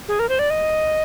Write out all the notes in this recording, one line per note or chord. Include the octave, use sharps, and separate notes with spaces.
G#4
A#4
C5
D5
D#5